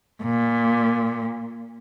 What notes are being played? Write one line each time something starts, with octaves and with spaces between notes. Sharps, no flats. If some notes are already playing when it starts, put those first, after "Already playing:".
A#2